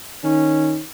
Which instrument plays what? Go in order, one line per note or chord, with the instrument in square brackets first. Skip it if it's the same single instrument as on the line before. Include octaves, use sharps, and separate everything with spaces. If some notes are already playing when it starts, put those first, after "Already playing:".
[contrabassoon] D#3 [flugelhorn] C#4